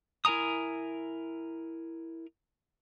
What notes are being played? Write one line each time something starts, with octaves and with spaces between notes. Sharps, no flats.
E4 A#4 G#5 A#5 D#6